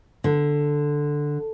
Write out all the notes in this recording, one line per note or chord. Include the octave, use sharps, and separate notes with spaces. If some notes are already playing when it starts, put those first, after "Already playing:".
D3